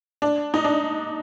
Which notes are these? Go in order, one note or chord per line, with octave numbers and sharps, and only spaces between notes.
D4
D#4
D4